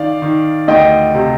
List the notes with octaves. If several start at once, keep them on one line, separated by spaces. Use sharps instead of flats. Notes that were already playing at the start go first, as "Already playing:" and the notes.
Already playing: D#3 D5 F5
D#3
D2 D#5 G5
C3